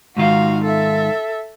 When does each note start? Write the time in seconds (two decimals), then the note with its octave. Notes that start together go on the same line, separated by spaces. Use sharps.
0.17 G#2 D#3 F4 F#4 F5
0.64 A4 E5